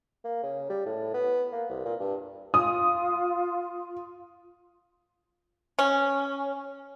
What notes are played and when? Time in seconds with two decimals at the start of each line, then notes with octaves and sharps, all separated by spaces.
0.24 A#3
0.43 C#3
0.69 G3
0.86 A2
1.14 B3
1.52 A#3
1.69 C2
1.85 A#2
2.00 G2
2.54 F4 D#6
5.79 C#4